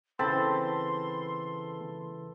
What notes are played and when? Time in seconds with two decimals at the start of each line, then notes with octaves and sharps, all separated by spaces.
0.19 C#3 E3 C4 A4 A5 B5 C6